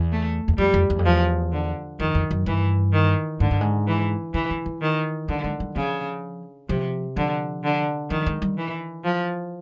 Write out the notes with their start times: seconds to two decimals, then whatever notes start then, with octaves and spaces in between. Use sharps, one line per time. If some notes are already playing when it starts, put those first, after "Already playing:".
Already playing: E2
0.12 A3
0.48 E2
0.58 F2 G3
0.74 F2
0.90 E2
0.99 F2
1.05 E2 F3
1.52 D3
2.00 F2 D#3
2.15 F2
2.31 F#2
2.46 G2 E3
2.93 D#3
3.40 G#2 D3
3.51 G2
3.61 G#2
3.87 E3
4.34 C#3 E3
4.50 D3
4.66 E3
4.82 D#3
5.28 D3 G3
5.44 G#3
5.60 G3
5.75 C#3 F3
6.69 C3 F3
7.16 D3 F3
7.64 D3
8.10 D#3 F3
8.26 G#3
8.42 G3
8.57 E3
9.04 F3